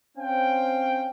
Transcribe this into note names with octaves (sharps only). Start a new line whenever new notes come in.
C4 C#4 F5 G5